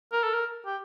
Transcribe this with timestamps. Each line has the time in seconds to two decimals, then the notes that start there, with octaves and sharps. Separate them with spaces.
0.13 A#4
0.23 A4
0.34 A#4
0.65 G4